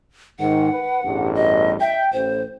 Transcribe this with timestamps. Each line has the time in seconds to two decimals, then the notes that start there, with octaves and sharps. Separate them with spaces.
0.39 G#2 D#3 F#5
0.73 B4
1.04 A1 E2 G2
1.35 D#5
1.81 E5 G5
2.13 A1 C5